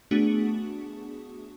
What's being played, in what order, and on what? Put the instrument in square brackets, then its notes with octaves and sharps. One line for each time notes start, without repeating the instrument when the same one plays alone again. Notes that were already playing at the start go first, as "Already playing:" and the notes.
[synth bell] A3 B3 D4 F#4 G#4